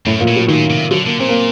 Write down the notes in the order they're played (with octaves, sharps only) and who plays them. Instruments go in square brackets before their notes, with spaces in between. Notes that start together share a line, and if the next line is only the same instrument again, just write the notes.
[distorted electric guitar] F#2 [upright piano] A2
[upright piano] A#2
[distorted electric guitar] A2
[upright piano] F#3
[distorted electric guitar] A#2 [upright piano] D#3
[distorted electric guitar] C3
[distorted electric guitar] D3 [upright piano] F#3
[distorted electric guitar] D3 [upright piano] A#3
[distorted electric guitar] A#2 [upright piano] C4
[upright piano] A#3